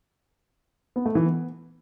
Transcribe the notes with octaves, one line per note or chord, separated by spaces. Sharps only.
B3
A3
E3
B3